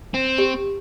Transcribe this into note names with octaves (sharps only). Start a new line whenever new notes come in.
C4
G4